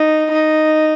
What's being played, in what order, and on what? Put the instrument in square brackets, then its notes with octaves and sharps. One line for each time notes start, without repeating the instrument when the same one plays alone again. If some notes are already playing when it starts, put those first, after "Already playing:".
Already playing: [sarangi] D#4
D#4